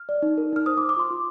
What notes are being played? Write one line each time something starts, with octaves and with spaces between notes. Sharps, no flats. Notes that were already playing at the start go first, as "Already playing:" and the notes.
Already playing: F6
D5
D#4
A#4
D#4 F6
C5 D#6
D6
C5
D6
F4 C6
F4